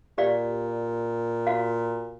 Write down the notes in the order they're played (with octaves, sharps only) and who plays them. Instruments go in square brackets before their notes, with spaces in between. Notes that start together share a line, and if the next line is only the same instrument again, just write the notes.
[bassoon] A#2 [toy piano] G4 D5 F5
[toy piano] F#4 F5